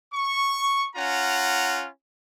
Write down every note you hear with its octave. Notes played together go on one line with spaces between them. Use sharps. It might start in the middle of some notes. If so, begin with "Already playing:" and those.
C#6
C#4 F4 F#5 A#5